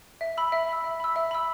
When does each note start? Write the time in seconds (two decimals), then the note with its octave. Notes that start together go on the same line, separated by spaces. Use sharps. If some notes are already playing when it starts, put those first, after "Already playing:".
0.21 E5
0.37 B5 E6
0.52 E5
0.69 B5 E6
0.84 E5
1.00 B5 E6
1.16 E5
1.31 B5 E6